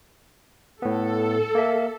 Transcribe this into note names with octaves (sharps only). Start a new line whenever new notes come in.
A2 B3 A4
A#3 E5